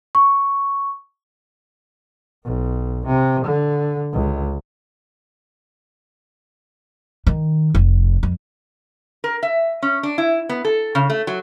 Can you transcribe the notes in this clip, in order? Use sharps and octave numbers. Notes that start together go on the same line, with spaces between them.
C#6
B1
C3
D3
C#2
D#3
F1
F2
A#4
E5
C#4
D4
E4
B3
A4
C#3
A3
F#3